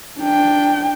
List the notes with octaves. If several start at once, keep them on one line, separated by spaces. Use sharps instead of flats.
D4 G5